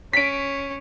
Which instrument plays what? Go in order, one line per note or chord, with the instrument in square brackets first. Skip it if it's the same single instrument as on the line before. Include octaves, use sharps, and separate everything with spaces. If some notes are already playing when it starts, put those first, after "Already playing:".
[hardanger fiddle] C#4 [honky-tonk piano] B6 D7